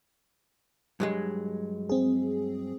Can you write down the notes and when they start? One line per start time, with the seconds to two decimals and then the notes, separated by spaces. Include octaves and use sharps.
1.00 G2 F#3 G#3
1.89 C4 G#4